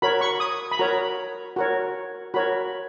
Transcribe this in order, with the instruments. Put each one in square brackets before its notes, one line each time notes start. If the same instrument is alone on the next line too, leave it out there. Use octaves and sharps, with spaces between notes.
[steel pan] F#4 A#4 C#5 B5
C#6
D#6
B5
F#4 A#4 C#5 A#5
F#4 A#4 C#5
F#4 A#4 C#5 B5